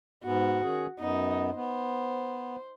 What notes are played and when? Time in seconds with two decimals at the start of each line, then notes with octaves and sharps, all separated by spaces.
0.24 G#2 B3 F#4
0.63 D#3 C#4 G#4
1.00 F#2 B3 D#4
1.55 B3 C5